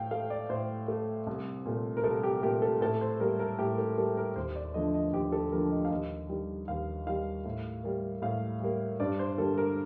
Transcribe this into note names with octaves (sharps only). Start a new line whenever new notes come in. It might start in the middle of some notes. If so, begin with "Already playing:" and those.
Already playing: A2 F5 G5
A3 F5
D5
A2 C5
A3
C2
A#2 A3
A#4
C2 A4
G4
A#2 A3 G4
A4
A2 A4
C5
G3 A#3 A#4
A#4
A2 G4
A4
G3 A#3 A4
A#4
D#2 C5
D5
D3 F3 A3 D#5
D#5
D#2 G4
A4
D3 F3 A3 A#4
D#5
F5
D#2 D#5
D#3 G3
D#2 F5
D#3 G3 F5
A2
G3 A#3
A2 F5
G3 A#3
G2 D5
C5
D3 G3 A#3 A4
A#4